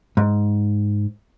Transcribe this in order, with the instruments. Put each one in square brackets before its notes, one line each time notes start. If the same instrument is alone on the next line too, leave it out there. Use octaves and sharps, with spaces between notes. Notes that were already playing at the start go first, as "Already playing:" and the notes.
[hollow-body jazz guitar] G#2